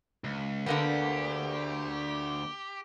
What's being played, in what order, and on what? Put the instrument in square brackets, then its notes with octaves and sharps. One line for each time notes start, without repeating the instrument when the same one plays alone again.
[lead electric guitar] C#2
[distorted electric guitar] D2 F#5 [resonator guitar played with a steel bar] D3 A#3 B3 [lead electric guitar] G4